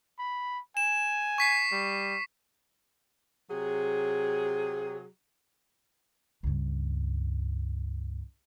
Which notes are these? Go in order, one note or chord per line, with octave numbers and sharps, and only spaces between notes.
B5
G#5 E7
C#6 B6 C7
G3
C3 F#3 G#4
C#2 G2